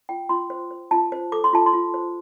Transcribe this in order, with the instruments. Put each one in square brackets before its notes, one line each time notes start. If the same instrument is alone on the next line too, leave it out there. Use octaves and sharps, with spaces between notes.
[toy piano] F4 G5
F4 C6
C5
C5
F4 A5
C5
A4 D6
C6
F4 A5
C6
F4
C5